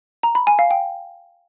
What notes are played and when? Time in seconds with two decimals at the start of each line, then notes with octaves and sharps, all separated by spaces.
0.23 A#5
0.35 B5
0.47 G#5
0.59 F5
0.71 G5